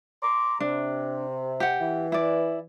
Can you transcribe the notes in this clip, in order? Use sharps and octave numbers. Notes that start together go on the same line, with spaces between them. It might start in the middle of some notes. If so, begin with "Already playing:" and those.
A#5 C6 D6
C3 D4
G4 F#5
E3
E4 D5